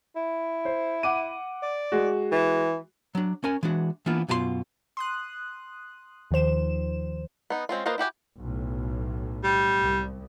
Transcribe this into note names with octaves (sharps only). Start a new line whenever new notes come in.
E4
C5
F#5 D6 D#7
D5
G#3 F#4
E3
F#3 D4
C#4 A#4 G#5
E3 G#3 D4 F#4
E3 A#3 B3 D4 E4 F4
F#2 B2 F4 G4 C6
C6 D#6 F#6
D#2 D#3 F3 C5 E7
B3 D#4
G#3 C4 C#4 F4
A#3 F4 B4 C5 D#5
E4 F#4 G4 G#5
B1 A2
G3
C2